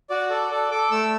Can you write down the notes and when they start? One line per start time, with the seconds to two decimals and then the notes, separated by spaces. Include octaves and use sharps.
0.10 F#4 D5
0.30 A4 D5
0.51 A4 D5
0.71 A4 D6
0.91 A3 E6